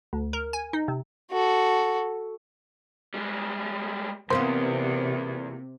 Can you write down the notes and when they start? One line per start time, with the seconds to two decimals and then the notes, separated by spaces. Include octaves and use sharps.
0.13 D2
0.33 A#4
0.53 G#5
0.73 D#4
0.88 C3
1.32 F#4 A4
3.14 G3 G#3
4.30 E2 C3 A#3 B3 F4 C5